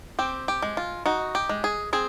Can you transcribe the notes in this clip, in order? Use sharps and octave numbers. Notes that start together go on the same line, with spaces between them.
C4 G4
G4
G#3
F4
D#4 F#4
G4
G#3
G#4
C4 G#4